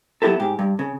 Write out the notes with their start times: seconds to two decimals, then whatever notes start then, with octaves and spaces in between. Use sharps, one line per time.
0.22 F#3 B3 D4 E4 G4 A4
0.40 G#2 G4
0.59 G2
0.79 C#3